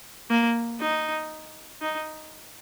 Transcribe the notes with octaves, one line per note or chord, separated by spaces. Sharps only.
A#3
D#4
D#4